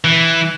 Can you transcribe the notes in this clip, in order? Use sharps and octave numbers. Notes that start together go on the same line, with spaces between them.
E3